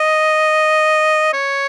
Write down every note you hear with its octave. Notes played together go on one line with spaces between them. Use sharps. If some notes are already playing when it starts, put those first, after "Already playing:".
Already playing: D#5
C#5